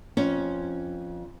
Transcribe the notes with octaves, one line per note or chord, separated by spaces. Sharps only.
F2 C#4